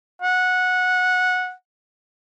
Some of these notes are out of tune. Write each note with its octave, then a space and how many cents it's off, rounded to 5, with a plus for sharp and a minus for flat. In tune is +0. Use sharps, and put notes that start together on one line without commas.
F#5 -15